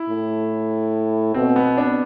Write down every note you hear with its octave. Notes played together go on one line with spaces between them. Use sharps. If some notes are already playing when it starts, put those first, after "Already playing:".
Already playing: E4
A2
B2 C4
B3
D4